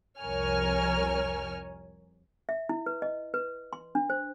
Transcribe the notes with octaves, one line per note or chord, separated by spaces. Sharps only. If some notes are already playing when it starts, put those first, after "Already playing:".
C2 F2 A#4 C#5 G#5 F6
E5
E4
B4
D#5
B4
C6
D4
C5